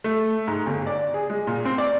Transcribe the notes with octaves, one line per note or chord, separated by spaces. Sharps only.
A3
G#2
G1
D5
G#4
G#3
A#2
C4
D5